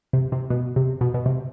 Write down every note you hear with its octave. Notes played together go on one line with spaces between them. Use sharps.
C3
C3
B2
C3
B2
B2
C3